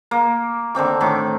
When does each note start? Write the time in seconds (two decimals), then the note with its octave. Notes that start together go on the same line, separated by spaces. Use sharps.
0.11 A#3
0.75 D3 D#3 C4 D6
1.00 A2 D#3 D6